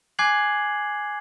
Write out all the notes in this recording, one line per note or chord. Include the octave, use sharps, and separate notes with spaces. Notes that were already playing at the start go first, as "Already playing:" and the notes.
G#5 D6 F#6 G#6 C7 F#7